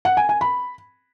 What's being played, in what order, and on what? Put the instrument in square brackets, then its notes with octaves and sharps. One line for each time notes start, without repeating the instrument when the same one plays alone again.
[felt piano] F#5
G#5
G#5
B5